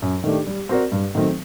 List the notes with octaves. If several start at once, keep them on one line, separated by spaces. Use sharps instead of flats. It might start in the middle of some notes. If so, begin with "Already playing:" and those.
F#2
D#3 A3 D4 G4
G3
C4 F#4 A#4 D5
G2
D#3 F#3 A3 C4